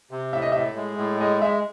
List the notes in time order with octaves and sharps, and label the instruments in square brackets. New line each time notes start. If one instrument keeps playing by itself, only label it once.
[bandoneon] C3
[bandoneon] A2 [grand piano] E5
[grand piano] D#5
[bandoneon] A2 [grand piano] E5
[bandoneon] G#3
A2
[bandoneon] G#3 [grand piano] D#5
[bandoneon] G#3 [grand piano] E5